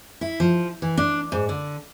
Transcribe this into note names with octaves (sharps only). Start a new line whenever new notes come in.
E4
F3
E3
D4
G#2
D3